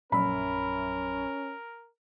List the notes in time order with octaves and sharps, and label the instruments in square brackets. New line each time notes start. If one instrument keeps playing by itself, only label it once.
[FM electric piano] A#1 F#2 E5 [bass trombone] C#4 [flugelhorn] A#4 [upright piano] B5